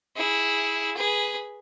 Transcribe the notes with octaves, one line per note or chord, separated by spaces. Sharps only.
E4 G#4
G#4 B4